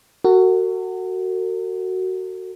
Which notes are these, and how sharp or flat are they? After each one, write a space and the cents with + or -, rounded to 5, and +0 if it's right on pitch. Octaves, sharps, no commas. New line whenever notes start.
F#4 +10 A#4 -45